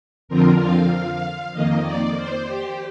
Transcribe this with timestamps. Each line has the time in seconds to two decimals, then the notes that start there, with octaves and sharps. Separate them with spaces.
0.28 F2 D3 F3 C4 F4 A#4
0.60 F5
1.53 F2 D#3 A#3 D#5
1.84 D5
2.16 C5
2.46 G4